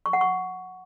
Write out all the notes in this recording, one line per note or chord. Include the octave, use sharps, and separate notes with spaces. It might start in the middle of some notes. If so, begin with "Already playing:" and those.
C#6
F#5
C#6